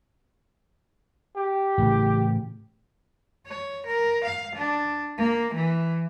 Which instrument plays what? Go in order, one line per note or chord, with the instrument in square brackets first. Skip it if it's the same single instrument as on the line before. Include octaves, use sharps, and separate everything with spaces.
[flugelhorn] G4
[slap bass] A2 C#3 E3
[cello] C#5
A#4
F5
D4
A#3
E3